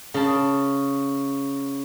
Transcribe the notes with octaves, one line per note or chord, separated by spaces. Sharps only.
C#3 A5